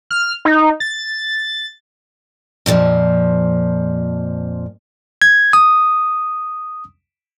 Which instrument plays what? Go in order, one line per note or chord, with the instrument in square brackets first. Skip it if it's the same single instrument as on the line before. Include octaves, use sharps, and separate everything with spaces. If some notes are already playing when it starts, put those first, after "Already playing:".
[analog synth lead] F6
D#4
A6
[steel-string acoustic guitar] F2 A#2 D3 F3
[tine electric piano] G#6
D#6